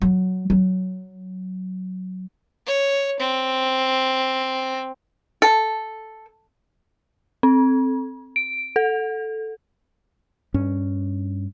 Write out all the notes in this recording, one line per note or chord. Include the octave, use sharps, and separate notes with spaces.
F#3
F#3
C#5
C4
A4
C4
D7
A4
G2 C#4